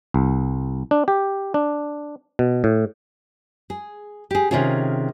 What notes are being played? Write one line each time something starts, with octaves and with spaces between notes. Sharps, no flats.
C2
D4
G4
D4
B2
A2
G#4
G4 G#4
C3 D#3 C#4 F4 G#4